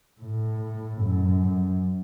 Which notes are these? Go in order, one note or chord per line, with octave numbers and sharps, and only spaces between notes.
A2
F#2